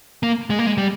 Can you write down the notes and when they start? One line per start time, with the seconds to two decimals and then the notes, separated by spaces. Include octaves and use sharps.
0.23 A#3
0.50 G#3
0.59 A#3
0.66 G#3
0.78 G3